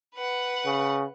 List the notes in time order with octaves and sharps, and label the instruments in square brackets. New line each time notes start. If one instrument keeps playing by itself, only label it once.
[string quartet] B4 F#5
[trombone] C#3